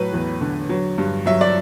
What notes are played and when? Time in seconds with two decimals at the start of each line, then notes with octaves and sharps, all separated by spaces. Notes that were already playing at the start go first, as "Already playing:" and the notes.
Already playing: A2 F#3 B4
0.13 E2
0.41 D3
0.69 F#3
0.98 G2
1.26 F#3 E5
1.41 D5